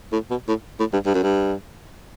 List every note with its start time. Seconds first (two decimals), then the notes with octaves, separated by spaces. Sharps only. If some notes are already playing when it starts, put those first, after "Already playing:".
0.13 A2
0.31 B2
0.48 A2
0.80 A2
0.93 G2
1.06 G2
1.14 F#2
1.23 G2